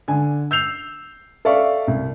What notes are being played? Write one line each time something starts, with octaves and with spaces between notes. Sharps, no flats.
D3 G#5
E6 G6 C7 F7
A4 D5 E5 F5 C#6
C2